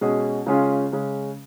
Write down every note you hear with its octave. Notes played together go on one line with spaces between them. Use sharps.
B2 G#3 C#4 G#4 D#5
C#3 G#3 C#4 F4 G#4
C#3 G#3 C#4